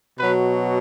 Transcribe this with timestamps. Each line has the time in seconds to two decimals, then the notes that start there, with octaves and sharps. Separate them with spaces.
0.19 B2 F#3 B4